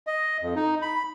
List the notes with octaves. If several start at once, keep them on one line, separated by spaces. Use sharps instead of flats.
D#5
F2
D#4
B5